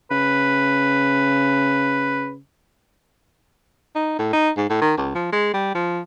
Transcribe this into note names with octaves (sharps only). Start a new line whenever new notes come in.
C#3 B4
D#4
A2
D#4
G#2
A2
D#3
C#2
F3
G#3
G3
F3